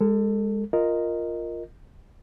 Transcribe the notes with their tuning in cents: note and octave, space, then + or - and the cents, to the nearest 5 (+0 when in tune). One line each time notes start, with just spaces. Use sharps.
G#3 -20 A4 +25
F4 +0 A#4 +0 D#5 +0